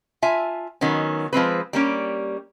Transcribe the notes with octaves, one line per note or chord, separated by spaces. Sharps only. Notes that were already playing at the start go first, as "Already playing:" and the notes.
F4 E5 G#5 A5
D#3 F#3 B3 C#4
F3 G#3 C4 B4
G3 A#3 C#4